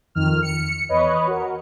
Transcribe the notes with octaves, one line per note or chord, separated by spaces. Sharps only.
F2 D#3 F6
C#7
E2 B4 C#5 D#5
F#4 A#4